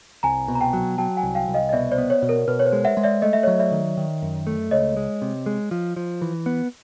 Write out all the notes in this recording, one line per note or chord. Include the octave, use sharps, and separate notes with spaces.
C2 G#5 A#5
B2
A#5
G5 A5
F#3
F#3 G5 A5
F#5 G#5
C2
F5 G5
C2
D#5 F5
D#5
B2 D5 E5
C5 D5
B3
C#5
B2
A#4
B2 B4
C#5
C5
G#3
E5 F#5
G#3
D5 E5
A3 D#5
E5
C#5 D#5
F#3
D5 E5
D#3
D#3
F#2
A3
C#2 C#5 D#5
G#3
C3
G#3
F3
F3
E3
B3